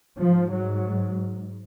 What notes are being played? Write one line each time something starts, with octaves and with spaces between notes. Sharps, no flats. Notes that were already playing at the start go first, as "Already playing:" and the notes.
G#2 F3
F#3